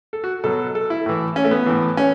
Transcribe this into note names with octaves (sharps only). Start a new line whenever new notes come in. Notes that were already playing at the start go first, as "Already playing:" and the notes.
A4
F#4
B2 F#3 A4
A4
E4
A2 E3
C#4
A3
B3
A2 E3
C#4